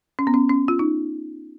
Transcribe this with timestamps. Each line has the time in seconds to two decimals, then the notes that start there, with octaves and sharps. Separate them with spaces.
0.19 C#4
0.27 B3
0.34 C#4
0.50 C#4
0.68 F4
0.79 D#4